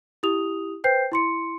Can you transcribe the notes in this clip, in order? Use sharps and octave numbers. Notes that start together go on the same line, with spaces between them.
E4 G4 D#6 F7
B4 C5 G5 G6 C7
E4 C6 C#7